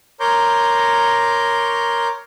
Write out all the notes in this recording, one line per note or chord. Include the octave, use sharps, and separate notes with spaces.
A#4 C#5 A#5 C6 D6 G6